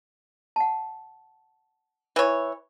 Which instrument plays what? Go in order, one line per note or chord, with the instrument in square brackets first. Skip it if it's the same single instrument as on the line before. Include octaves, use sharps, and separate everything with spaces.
[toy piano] F#5 A5
[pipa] E3 C#5